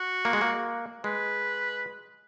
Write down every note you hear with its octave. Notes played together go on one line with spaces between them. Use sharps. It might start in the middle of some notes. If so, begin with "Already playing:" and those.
Already playing: F#4
A#3
G#3
A#3
G#3 B4